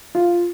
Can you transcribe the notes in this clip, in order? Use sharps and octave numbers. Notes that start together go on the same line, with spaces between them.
F4